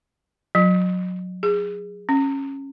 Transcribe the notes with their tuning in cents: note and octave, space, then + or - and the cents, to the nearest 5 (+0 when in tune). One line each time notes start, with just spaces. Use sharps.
F#3 -20
G#4 -20
C#4 -20